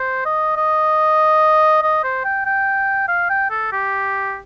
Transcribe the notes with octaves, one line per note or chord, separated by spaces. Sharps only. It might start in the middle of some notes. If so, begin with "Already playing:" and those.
Already playing: C5
D#5
D#5
D#5
C5
G5
G5
F5
G5
A4
G4